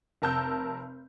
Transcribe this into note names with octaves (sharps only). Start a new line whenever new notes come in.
F1 A#4 A5 E6 G6